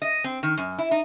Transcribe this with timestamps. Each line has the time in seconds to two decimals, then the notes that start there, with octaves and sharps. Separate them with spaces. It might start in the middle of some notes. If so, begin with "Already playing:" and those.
0.02 D#5
0.24 C4
0.43 D#3
0.57 F#2
0.78 E4
0.91 D#4